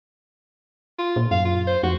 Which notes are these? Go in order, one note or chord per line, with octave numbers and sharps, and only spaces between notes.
F4
A#2
F#2 F5
F4
C5
F2 F#4